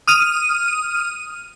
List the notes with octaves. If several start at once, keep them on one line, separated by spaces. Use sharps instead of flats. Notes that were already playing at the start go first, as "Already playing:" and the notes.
D#6 F6 D#7